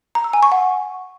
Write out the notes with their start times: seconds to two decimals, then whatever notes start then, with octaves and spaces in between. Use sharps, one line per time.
0.15 A#5
0.24 E6
0.33 G#5
0.43 C#6
0.52 F#5